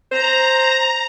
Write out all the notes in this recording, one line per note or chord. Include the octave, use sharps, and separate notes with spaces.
C5 A#5